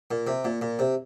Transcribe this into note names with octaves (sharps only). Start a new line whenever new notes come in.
A#2
C3
A#2
A#2
C3